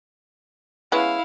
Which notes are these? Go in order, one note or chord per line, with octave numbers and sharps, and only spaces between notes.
G#3 B3 C#4 E4 F5